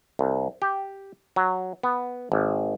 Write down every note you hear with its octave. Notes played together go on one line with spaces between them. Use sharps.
C2
G4
F#3
B3
G#1